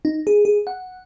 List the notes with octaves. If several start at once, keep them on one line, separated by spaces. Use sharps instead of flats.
D#4
G#4
G#4
F#5